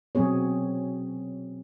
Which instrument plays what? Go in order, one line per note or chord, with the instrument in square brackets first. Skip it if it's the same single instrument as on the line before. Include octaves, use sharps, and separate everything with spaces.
[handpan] B2 F#3 C4 C#4 G#4 C#5